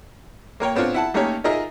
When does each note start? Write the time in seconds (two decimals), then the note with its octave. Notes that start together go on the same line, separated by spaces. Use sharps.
0.60 A#3 A#4 C#5 G5
0.75 B3 C4 D4 F4 C#5
0.94 E4 F#5 A5
1.14 A3 A#3 C#4 D#4 G4 C#5
1.44 D#4 F4 G#4 A#4 D#5 E5